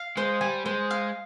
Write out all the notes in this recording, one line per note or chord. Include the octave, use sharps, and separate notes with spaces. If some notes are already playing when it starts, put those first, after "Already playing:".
Already playing: F5
G#3 C5
G3 G#5
G#3 C5
F5